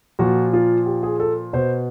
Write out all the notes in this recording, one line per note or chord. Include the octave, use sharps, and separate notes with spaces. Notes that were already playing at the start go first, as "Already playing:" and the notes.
A#2 F3 F#4
F4
G4
G#4
A4
B2 C5